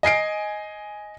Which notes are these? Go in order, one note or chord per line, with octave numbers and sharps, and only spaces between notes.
D#5 G#5 C7 D7